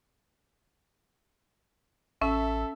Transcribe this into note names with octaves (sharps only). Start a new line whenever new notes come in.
A1 C#4 A4 E5